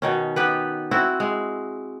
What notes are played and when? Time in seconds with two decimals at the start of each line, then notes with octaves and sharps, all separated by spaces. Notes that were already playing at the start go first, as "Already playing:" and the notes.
0.02 B2 D#3 C#4
0.36 B3 G4 B4
0.91 C4 E4 F#4
1.20 G#3